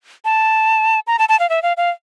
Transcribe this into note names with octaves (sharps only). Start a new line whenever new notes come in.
A5
A#5
A5
A5
F5
E5
F5
F5